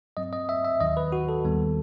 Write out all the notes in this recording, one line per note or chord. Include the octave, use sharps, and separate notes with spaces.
G2 F#3 C4 D#5
D#5
E5
E5
D#2 D#3 F#3 D#5
B4
F#4
A4
D#2 D#3 G3 B3